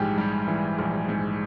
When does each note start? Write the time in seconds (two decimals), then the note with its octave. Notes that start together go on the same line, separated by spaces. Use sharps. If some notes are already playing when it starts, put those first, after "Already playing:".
Already playing: A#1 G#2 E3 G3 G4 G#4
0.18 G3
0.48 E3
0.79 A#1
1.09 G#2